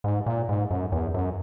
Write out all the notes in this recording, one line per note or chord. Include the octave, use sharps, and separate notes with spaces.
G#2
A#2
G#2
F#2
E2
F#2